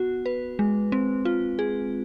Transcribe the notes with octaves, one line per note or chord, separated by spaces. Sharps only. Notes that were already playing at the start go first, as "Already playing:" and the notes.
Already playing: B3 F#4
B4
G#3
C4
F4
G#4